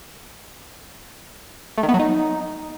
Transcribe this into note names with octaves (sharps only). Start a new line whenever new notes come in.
A3
D#3
B3
F#3
D#4